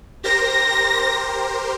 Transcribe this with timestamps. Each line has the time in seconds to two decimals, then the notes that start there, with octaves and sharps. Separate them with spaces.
0.24 G4 A#4 C5 A#6